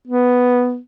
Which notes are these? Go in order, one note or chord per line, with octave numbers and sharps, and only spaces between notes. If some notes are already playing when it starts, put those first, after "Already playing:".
B3